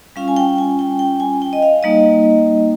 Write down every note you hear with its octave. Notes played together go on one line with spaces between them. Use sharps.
G3 C#4 F4 F5
G#5
G5
G#5
G5
G5
G#5
G5
D#5
F5
G3 A#3 D#4 D#5